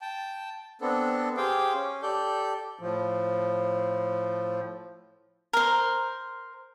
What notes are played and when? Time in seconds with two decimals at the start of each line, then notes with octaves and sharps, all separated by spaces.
0.01 G5 A5
0.81 B3 C4 D4 A4
1.37 G4 G#4 C5 F5 G5
1.74 C#4
2.03 G4 A4 D5 G6
2.79 A2 F3
5.53 A#4 C5